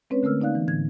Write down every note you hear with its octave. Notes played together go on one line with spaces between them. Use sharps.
G#3 C4 C#4 B4 C#5
D3 A3 A#4 E6 F6
B3 D#4 D5 F5 F#6
E3
A2 D3 G#6